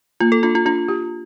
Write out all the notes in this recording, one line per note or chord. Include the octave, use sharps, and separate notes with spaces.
A#3 F4
A4
D4 F4
F4
D4 F4
G4